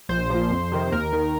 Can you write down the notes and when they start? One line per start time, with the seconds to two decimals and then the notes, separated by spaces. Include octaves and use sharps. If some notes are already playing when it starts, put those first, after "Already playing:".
0.09 A#1 C5
0.30 A#2 F3
0.51 F2
0.72 C3 D#3
0.92 D#2 A#4
1.13 D#3